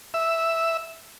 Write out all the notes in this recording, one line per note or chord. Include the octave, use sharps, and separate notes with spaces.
E5